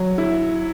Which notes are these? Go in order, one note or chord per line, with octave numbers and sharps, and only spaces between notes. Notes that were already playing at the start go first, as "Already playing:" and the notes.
Already playing: F#3
E4